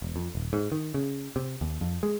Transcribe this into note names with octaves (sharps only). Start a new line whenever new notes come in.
E1
F2
D#1
G#2
D#3
C#3
C3
D#2
F2
G#3